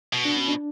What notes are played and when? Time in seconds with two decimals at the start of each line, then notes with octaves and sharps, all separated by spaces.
0.13 B2
0.25 D4
0.37 C#4
0.48 D4